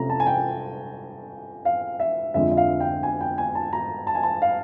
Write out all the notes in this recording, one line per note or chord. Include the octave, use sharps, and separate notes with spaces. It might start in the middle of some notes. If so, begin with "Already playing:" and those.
Already playing: C3 F3 A3 C#4 A#5
A5
G#5
G5
F5
E5
F2 D3 F3 G#3 E5
E5
F5
G5
G#5
G5
G#5
A5
A#5
A5
G#5
A5
F5